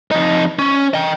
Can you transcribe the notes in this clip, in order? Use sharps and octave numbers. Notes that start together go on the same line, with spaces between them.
F2 D#4
C#4
D#5 G5